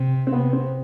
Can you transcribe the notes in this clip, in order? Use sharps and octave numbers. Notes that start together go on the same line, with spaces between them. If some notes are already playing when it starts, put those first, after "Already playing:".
Already playing: C3
C4
C3 B3
C4